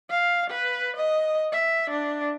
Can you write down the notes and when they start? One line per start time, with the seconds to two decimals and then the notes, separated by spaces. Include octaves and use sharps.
0.10 F5
0.50 B4
0.97 D#5
1.52 E5
1.90 D4